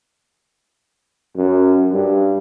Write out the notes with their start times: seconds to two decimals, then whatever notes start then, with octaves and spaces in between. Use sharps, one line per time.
1.37 F#2
1.92 G2